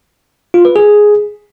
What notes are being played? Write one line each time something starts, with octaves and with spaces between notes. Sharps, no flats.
F4
B4
G#4